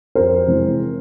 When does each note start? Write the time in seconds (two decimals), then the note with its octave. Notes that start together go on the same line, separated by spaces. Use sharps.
0.15 F2 A#4 C5
0.47 C3 E3 G#3 C4